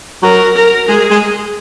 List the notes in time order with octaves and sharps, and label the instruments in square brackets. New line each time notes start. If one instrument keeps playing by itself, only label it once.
[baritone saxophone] F#3 [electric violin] A#4
[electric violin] A#4
[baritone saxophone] G#3 [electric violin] G#4
[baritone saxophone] G#3